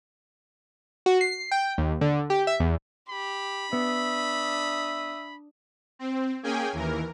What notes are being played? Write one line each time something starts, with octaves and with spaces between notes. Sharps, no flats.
F#4
C7
G5
D#2
D3
G4
E5
E2
G4 B5
B3 D4 E5 D#6
C4
A#3 C#4 G#4 G5 G#5
D#2 E3 A#4